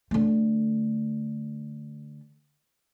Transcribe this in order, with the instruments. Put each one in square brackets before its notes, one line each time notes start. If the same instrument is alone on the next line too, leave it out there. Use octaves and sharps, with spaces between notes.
[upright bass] D3 A3